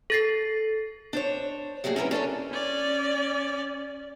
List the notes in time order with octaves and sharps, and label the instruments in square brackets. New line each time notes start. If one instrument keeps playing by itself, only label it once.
[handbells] A4 A6 C7
[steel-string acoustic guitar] D4 C5 C#5
F#3 G3 A3 A#3 G#4
C#4 E4 G#4 A#4 B4
C#4 D4 E4 A4 C#5
[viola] C#4 D5